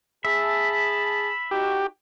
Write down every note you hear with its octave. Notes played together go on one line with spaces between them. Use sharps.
G#4 E5 A5 B5
D#4 F#4 G4